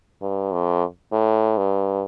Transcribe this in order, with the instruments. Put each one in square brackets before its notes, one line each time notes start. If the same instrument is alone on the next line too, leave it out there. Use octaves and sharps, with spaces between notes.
[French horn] G2
F2
A2
G2